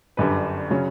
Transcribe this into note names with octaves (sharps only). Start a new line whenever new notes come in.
G1 F#2 D3 G3 B4
C#3 F#3 C#4